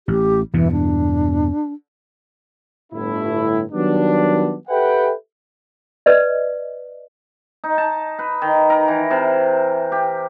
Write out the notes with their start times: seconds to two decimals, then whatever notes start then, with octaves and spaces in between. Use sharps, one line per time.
0.08 A1 G4
0.54 E2 G2 B2 E3
0.72 D4
2.93 G1 A2 E4
3.71 D#3 F#3 G3 B3 D4
4.68 G4 A4 B4 E5 F#5 G5
6.06 B4 D5 D#5
7.64 D#4
7.78 A5
8.19 B4
8.42 D#3
8.70 A#4
8.88 E3
9.11 C3
9.92 G4